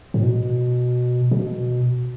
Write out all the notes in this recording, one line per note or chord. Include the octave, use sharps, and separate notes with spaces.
A2
B2
B2